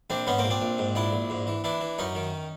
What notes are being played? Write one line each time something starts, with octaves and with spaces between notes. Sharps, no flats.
A#1 C4 D4
G#2 B3 C#4
A#3 C4
A#1
C4 D4
A#1
G#2
A#1 D4 E4
A#1
G#2
E3
E3 D4 E4
E3
F#2 C#4 D#4
D#3